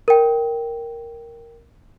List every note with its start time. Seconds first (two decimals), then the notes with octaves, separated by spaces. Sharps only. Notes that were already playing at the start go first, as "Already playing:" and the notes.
0.08 A#4 G5